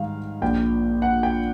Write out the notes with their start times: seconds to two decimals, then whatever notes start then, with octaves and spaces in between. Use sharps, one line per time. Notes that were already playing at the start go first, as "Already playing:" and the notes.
Already playing: G#2 D#3 G3 F5
0.42 A#1 A#2 F3 G5
1.02 F#5
1.23 G5